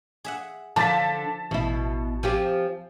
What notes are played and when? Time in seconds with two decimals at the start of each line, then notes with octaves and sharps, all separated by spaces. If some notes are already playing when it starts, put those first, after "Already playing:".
0.25 G#4 E5 F#5
0.76 D3 F3 D4 C5 A5 C6 A6 B6
1.51 A1 B2 E4
2.23 F3 C4 G4 G#5